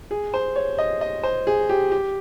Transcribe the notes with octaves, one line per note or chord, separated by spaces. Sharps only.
G#4
C5
C#5
D#5
D#5
C5
G#4
G4
G4